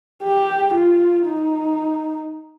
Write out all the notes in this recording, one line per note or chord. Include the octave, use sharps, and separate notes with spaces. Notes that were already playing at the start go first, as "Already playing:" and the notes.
G4
F4
D#4